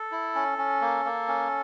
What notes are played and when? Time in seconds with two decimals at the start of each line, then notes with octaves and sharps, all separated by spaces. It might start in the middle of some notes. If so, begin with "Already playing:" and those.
Already playing: A4
0.12 E4
0.35 C#4
0.58 C#4
0.81 A#3
1.05 A#3
1.28 C#4